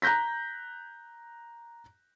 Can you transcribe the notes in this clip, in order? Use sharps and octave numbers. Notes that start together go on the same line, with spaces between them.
A#5 F#6 G6 A#6 B6